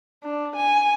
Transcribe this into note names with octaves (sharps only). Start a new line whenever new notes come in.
D4
G#5